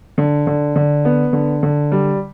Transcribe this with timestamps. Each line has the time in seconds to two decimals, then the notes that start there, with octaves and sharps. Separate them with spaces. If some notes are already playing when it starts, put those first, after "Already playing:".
0.18 D3
0.47 D3
0.76 D3
1.05 B3
1.33 D3
1.63 D3
1.92 G3